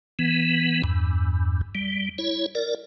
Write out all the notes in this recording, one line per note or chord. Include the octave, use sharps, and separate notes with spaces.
E3 B3
E2 G2
G3
E4 C#5
A#4 D5